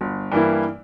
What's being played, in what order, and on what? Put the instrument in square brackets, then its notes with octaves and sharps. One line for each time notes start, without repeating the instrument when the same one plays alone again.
[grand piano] G1
G2 E3 A#3 E4